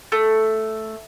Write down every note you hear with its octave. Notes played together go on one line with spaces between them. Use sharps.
A3